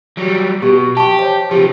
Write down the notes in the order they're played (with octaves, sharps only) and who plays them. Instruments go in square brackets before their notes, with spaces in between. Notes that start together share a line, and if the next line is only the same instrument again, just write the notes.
[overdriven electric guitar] F#3 G3
[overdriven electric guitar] B2 [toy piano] G4
[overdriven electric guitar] G4 [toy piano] A5 C#6
[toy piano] C5 C#5
[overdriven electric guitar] C3 F3 [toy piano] G4